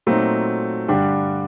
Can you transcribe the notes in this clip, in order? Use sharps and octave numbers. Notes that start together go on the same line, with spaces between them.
A#2 F#3 A3 C4 D#4
G2 D3 G3 D4 G4